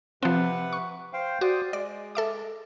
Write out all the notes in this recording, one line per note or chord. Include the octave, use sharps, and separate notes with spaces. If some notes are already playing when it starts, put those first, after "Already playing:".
C3 F3 C4 B4 F#5
C#6
C5 F5 G5
F#4 C5 D5 D#6
G#3 D5
A4 E5 D6